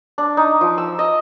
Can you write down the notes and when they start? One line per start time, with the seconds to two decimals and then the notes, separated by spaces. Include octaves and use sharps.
0.18 D4
0.37 D#4
0.61 F3
0.78 E6
0.99 D#5